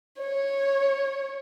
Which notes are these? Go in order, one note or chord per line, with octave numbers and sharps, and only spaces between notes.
C#5